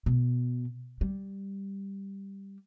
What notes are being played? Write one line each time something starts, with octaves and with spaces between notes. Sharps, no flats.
B2
G3